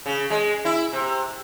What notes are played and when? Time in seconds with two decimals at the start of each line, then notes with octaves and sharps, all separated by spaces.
0.06 C#3
0.30 G#3
0.65 E4
0.93 C3